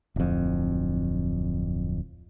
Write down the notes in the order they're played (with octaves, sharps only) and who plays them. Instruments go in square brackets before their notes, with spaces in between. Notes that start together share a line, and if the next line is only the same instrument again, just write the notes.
[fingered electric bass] D1 F2